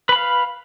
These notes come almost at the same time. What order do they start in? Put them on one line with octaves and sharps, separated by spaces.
B4 B5 F5